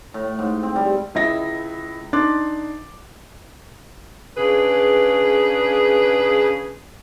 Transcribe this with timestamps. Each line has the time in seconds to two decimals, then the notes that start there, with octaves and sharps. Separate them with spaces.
0.14 A2
0.39 G#2
0.63 C4
0.76 G3
1.15 C#2 E4 D#5 E5 A#6
2.13 D4 D#4 C6 D6 F#6 A6
4.37 C#3 D4 G#4 B4